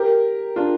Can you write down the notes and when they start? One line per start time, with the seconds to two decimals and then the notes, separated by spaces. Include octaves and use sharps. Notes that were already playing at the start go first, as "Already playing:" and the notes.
Already playing: G4 A#4
0.56 D4 F4